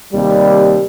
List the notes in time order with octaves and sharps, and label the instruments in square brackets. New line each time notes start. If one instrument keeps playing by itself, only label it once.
[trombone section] D#2 C3 G3